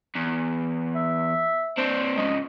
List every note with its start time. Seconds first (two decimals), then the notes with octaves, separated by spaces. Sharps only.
0.16 E2
0.95 E5
1.77 C4 D4 C5
2.17 G#2 C#3 D#5